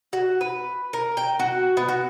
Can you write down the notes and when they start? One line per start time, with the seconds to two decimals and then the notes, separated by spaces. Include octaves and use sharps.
0.13 F#4
0.41 B4
0.93 A#4
1.17 G5
1.39 F#4
1.77 B3
1.89 F#4